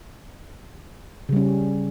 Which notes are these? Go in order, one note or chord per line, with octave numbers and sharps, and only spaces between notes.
C#3 G3 C#4